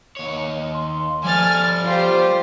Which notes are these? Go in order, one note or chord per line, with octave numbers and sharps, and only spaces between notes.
D#2 C#5
C6
F3 G3 A3 G#5 F6 A6
F4 G4 C5